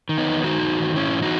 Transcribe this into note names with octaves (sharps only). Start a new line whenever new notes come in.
D#3
B3 D#4
E2
D#3 D#4 F#4
E2
D#3
G#2 C#4 E4
E3
D#4 F#4